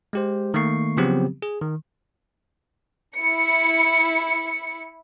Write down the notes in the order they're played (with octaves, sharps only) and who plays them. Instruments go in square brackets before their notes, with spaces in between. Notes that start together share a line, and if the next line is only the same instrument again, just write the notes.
[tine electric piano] G#3 G4 C5
D#3 A3 A#3 C#6 C7
C#3 F3 F#3 B3 C4 G4
G#4
D#3
[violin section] E4 C#7